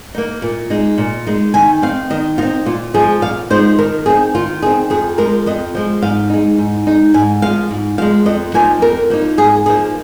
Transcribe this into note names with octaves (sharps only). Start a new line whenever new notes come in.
A#3 D#4
A#2
G#3 D#4
A#2
G#3 D#4
D#3 G#5
C4 D#4 F5
D#3 D#5
C4 D#4 F4
A#2 F4
F3 G#3 D#4 G#4
A#2 F5
F3 G#3 D#4 C5
D#3 A#4
C4 D#4 G#4
D#3 F4
C4 D#4 G#4
F2 G#4
F3 G#3 A#4
F2 D#5
F3 G#3
G#2 F5
G#3 D#4
G#2
G#3 D#4
G#2 G#5
F3 G#3 F5
G#2
F3 G#3 F5
F2 D#5
F3 A#3 D#4 G#5
F2 A#4
F3 A#3 D#4
G#2 G#4
F3 A#3 D#4 G#4